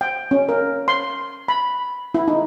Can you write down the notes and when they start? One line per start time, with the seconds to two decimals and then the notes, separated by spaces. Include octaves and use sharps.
0.01 G5
0.31 C#4
0.49 A#4
0.88 C6
1.48 B5
2.15 E4
2.28 D#4